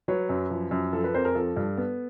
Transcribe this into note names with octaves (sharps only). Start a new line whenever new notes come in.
F#3 B4 C#5
F#2
F3
F#2
F3 A4
A4 B4
F2 A#4 C5
G#4 A#4
F3 A4
G2
B3